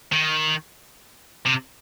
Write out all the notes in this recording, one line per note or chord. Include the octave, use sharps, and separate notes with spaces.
D#3
C3